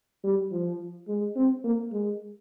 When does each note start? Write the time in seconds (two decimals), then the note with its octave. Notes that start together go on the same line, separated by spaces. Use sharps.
0.24 G3
0.52 F3
1.08 G#3
1.36 C4
1.64 A#3
1.92 G#3